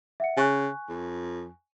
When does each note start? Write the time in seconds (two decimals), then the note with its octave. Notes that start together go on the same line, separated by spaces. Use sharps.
0.20 E5 F#5 C#7
0.37 C#3 G#5 C#6 F#6
0.89 F2